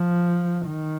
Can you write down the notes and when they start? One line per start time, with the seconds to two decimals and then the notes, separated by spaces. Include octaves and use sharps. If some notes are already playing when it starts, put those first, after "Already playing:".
Already playing: F3
0.66 D#3